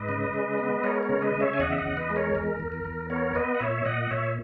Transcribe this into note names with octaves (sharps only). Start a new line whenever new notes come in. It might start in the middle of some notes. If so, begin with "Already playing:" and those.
Already playing: G#2 B4 D#5
C#3
G#3
B3
G#3 A#4 C#5
A#4 C#5
C#3
B4 D#5
C#3
C#5 E5
G#5
E2 D#5 F#5
E5
D#5 F#5
E2
B4 D#5
G#3
A#4 C#5
E2 A#4
E2
A#4
E2
B3 A#4 C#5
B3 B4 D#5
F#5
A#2 C#5 E5
A#2 D#5 F#5
A#2 C#5 E5